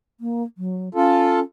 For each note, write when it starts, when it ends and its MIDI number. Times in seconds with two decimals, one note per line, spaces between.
0.20 0.43 58
0.58 0.89 54
0.95 1.42 61
0.95 1.40 65
0.95 1.40 69